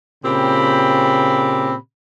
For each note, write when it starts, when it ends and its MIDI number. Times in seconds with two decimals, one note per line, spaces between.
0.24 1.76 46
0.24 1.76 49
0.24 1.76 60
0.24 1.76 67
0.24 1.76 83